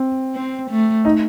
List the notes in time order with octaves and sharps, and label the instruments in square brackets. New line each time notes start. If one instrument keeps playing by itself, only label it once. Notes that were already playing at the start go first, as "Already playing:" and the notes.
Already playing: [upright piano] C4
[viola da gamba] C4
A3
[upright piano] D#4